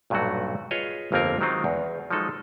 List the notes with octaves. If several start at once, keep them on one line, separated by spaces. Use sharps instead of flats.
B1 G2 A#2 F#3 A3 F#4
F4 G#4 B4 C#5 D#5
G1 F2 A#3 C4 F4 A#4
D#3 F#3 G#3 C4 D#4 F4
E2
F3 F#3 G#3 D#4 A4